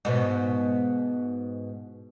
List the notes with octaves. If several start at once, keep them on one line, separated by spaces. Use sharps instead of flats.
G#2 B2